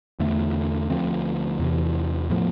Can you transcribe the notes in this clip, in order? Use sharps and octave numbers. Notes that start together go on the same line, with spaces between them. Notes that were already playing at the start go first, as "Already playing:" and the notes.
E2 D3 A3
D2 D3 F3 C4
E2 C3 E3
A2 F3 B3